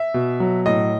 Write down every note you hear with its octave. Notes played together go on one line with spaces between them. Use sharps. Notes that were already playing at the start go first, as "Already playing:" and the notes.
Already playing: E5
B2
F#3
A2 D#5